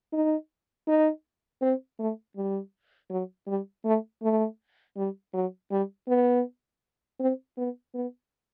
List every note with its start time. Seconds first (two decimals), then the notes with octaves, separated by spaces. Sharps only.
0.13 D#4
0.87 D#4
1.62 C4
1.99 A3
2.37 G3
3.10 F#3
3.47 G3
3.85 A3
4.22 A3
4.96 G3
5.34 F#3
5.71 G3
6.08 B3
7.20 C4
7.57 B3
7.94 B3